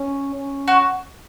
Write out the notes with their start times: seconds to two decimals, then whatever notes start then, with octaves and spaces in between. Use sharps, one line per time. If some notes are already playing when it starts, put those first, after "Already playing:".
Already playing: C#4
0.36 C#4
0.68 F#4